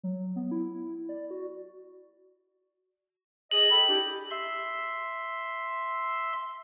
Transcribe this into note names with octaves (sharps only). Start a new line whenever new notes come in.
F#3
B3
E4
D5
F#4
G#4 D#5 F#7
A4 G5 B5
D4 E4 G4
E5 C6